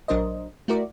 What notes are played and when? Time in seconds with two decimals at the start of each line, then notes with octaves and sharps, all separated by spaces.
0.08 A#1 F#3 D4 A#4 C5 D#5
0.68 A3 E4 F#4 A#4 D5